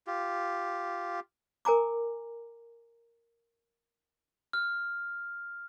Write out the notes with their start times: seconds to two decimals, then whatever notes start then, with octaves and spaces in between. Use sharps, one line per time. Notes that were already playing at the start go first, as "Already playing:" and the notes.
0.07 F4 G4
1.65 A#4 G#5 A#5 D6
4.53 F6